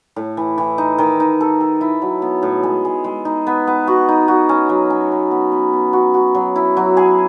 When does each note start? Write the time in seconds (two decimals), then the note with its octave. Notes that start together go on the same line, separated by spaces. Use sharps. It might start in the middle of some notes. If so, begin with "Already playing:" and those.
0.16 A2
0.37 E3
0.58 E3
0.78 D#4
0.98 D#3
1.20 D#4
1.40 A4
1.61 A4
1.81 E4
2.02 F#3
2.22 B3
2.42 A2
2.63 G#3
2.85 G#3
3.04 G#3
3.25 D#4
3.47 B3
3.67 B3
3.87 F#4
4.09 D#4
4.28 F#4
4.49 C#4
4.69 F#3
4.90 C#4
5.12 B3
5.31 B3
5.52 B3
5.73 B3
5.93 F#4
6.14 F#4
6.35 F#3
6.56 E4
6.77 F#3
6.97 G#4